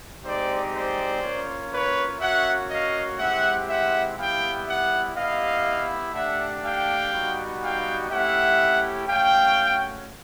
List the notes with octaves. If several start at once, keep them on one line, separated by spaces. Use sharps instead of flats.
G#3 C4 D#4 G4 C5 D5
C5 D5
A#3 C#4 F4
B4 C#5
A#3 C#4 F#4 E5 F#5
D#5 F5
G#3 C4 E4 G4 E5 F#5
E5 F#5
G3 B3 E4 G4 F5 G5
E5 F#5
B3 E4 G4 D#5 F5
A3 D4 G4 E5 F#5
F5 G5
G3 B3 D#4 F#4
F5 G5
A3 C#4 E4 G4 E5 F#5
A3 C#4 F#4 F5 G5